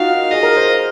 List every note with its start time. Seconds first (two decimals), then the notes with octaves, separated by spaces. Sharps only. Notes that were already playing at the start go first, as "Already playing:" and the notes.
Already playing: D#4 F4 F#4 A#4 F5
0.31 G#4 D#5
0.43 A#4
0.56 C5